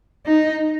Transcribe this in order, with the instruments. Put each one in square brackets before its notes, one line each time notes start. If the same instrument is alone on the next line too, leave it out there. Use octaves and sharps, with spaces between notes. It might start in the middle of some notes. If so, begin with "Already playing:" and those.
[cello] D#4